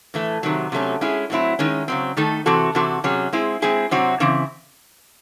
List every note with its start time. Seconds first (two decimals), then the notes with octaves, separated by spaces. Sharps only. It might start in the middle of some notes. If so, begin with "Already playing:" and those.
0.14 A2 E3 A3
0.43 C3 D#3 F#3
0.72 C3 F#3 A3 C#4
1.01 G#3 C#4 E4 G#4
1.30 A2 F#3 C4 E4
1.59 D#3 G#3 C#4
1.88 C#3 F#3 C4
2.17 D#3 A3 D#4 A4
2.46 C3 E3 C4 F#4 A4
2.75 C3 E3 C4 F#4 A4
3.04 C3 F#3 C#4 G#4
3.33 G#3 C4 E4 G#4
3.62 G#3 C4 E4 G#4
3.91 C3 F#3 C4 F#4
4.20 C#3 E3 C4 E4